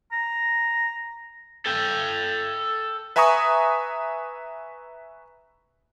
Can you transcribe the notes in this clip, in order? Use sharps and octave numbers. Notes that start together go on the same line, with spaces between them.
A#5
A4 G5
B4 E5 G#5 A#5 C#6 D#6